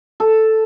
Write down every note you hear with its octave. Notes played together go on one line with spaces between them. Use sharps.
A4